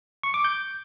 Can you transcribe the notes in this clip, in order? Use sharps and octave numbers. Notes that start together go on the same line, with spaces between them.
C#6
D6
G6